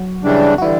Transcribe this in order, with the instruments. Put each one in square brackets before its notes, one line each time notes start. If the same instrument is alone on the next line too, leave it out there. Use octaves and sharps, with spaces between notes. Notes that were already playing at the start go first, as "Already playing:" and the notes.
Already playing: [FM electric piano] F#3 F#4
[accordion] C#3 E3 G3 D4
[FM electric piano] F#4
[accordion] D3 G3 [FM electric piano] E3 E4